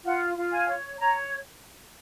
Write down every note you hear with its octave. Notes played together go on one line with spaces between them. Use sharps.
F4 F#5
F4
G#5
C#5
C#5 A#5